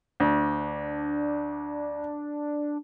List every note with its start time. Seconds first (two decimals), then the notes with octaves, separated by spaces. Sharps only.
0.20 D2 D4